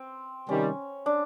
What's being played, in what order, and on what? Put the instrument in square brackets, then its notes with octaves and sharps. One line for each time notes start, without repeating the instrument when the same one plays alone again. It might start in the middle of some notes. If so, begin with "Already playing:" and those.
Already playing: [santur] C4
[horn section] C3 D#3 G3 [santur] C#4
[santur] D4